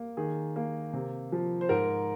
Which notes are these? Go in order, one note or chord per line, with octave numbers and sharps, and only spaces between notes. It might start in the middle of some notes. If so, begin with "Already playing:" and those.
Already playing: A#3
D#3 G#4
A#3
C3
F3
C5
G#2 A#4